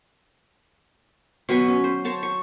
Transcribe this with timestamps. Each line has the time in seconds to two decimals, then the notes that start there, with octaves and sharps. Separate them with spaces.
1.49 B2 F#3 B4 G#5
1.68 C#4
1.84 C5
2.04 C5 C#5 A5 A#5
2.23 C#6